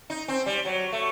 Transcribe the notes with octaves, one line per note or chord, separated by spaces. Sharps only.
D#4
C4
G3
F#3
A3